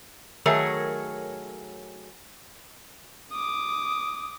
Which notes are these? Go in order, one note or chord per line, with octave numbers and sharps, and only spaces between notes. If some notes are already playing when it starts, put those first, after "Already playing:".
D#3 F#3 A3 G#4 A#4 C#5
D6 D#6